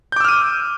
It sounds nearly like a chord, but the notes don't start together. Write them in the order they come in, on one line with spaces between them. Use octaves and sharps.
G6 D6 E6 F6 D#7